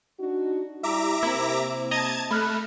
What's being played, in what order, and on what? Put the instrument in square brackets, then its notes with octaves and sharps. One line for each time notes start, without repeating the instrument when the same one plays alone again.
[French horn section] D4 D#4 F#4
[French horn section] G3 E4 G4 [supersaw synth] E5 A#5 D6
[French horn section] C3 [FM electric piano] A#3 [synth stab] E4
[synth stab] D#5 A#5 [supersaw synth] A5 G#6
[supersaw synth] A3 [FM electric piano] B5 F6 F#6